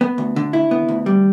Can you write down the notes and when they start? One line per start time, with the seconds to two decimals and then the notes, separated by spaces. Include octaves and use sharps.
0.01 B3
0.18 D2
0.36 D3
0.53 E4
0.71 B3
0.88 D2
1.06 G3